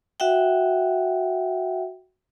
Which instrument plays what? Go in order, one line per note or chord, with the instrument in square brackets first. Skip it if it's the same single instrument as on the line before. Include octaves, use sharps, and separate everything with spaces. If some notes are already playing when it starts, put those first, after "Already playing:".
[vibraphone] F#4 E5 F#5 G5